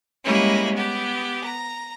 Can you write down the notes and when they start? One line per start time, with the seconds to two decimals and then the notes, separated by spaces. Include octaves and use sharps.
0.23 G3 G#3 A#3 C#4 E4
0.73 B3 G4
1.43 A#5